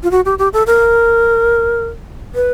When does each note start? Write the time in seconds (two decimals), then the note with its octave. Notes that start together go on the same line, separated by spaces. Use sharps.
0.03 F4
0.11 F#4
0.25 G4
0.39 G4
0.53 A4
0.67 A#4
2.35 B4